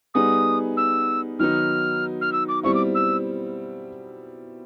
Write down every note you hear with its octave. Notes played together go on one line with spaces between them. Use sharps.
G3 B3 D#4 G#4 D#6
E6
D#3 F#3 B3 D#4 F6
F6
E6
D6
B2 G3 C4 E4 C#6
D6
E6